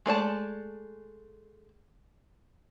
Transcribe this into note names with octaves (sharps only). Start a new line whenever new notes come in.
G#3 A3 D5 A5